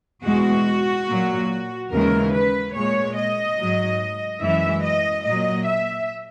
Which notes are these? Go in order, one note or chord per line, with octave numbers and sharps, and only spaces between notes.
E2 B2 G#3 F#4
A#2 F#3
D#2 C#3 E3 G#3 A#4
B4
A#2 G#3 C#5
D#5
G#2 F#3
F#2 E3 G#3 E5
D#5
A#2 F#3 D#5
E5